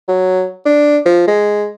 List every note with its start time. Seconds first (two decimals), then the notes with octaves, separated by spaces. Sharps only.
0.08 F#3
0.66 D4
1.06 F3
1.28 G#3